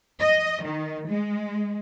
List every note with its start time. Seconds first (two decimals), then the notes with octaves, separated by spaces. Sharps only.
0.21 D#5
0.64 D#3
1.09 G#3